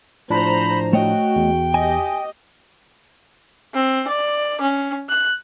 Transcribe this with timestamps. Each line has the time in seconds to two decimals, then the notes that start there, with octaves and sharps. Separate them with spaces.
0.30 A2 F3 D4 C5 A#5 B5
0.93 A3 F#4 C#5 D#5 G5
1.36 E2
1.74 G4 D#5 G#5
3.74 C4
4.08 D5
4.61 C#4
5.09 F#6